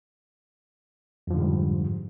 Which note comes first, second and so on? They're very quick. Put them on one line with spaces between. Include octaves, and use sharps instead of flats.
F2 F3 D3 G#2 G3